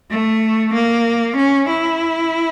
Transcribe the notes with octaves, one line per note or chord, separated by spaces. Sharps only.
A3
A#3
C#4
E4